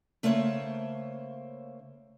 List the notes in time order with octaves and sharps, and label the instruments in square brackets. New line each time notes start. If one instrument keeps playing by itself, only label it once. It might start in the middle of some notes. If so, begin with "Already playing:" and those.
[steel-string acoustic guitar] C#3 A3 A#3 C5 C#5